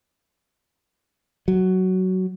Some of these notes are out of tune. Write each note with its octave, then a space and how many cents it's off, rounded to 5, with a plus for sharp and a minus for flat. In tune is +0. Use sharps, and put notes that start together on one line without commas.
F#3 +10